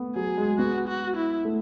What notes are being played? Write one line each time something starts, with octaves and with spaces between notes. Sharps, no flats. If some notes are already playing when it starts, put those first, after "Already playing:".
Already playing: A3 B3
F#3 G#4
G#3
B3 F#4
F#4
E4
A3